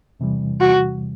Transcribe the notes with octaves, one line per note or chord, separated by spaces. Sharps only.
E2 C3 E3 G3
F#4